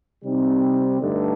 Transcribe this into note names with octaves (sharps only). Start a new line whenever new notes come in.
C3 G3 C4 D#4
G2 D3 A3 D#4